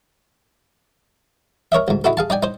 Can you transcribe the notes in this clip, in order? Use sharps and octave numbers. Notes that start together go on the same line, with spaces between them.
A#4 C#5 D#5 E5
D2 G#2
D#4 E4 F#4 A4
G#4 F5 A5
D#4 D5 G5 G#5
D#4 C5